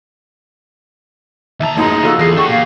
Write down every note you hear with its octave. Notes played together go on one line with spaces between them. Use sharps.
D#2 E5 A5 A#5
A1 F#2 A#3 D#4 G#4
F3 F4 F#4 A4
E2 G#4 A4 A#6 C7
D4 F#4 G4 C#6
A#2 F5